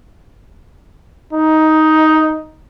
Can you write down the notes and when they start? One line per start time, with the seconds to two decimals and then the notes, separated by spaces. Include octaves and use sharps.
1.33 D#4